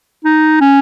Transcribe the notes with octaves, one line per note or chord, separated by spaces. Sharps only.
D#4
C#4